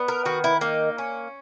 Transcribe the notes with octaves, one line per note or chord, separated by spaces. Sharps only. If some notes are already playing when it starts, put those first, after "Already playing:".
Already playing: B3
A#4
D#3 F#4
E4
A#3 D#4
C#4